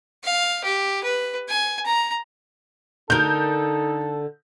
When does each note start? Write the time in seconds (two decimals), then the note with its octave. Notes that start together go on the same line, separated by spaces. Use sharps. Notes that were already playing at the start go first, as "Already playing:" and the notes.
0.24 F5
0.64 G4
1.03 B4
1.49 G#5
1.86 A#5
3.10 D3 D#4 A4 A#4 G6